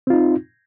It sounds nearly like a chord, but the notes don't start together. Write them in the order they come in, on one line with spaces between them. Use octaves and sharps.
C4 F4 D#4